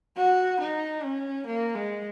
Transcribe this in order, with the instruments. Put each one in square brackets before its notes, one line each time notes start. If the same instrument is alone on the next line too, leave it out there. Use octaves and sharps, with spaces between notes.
[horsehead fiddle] F#4
D#4
C#4
A#3
G#3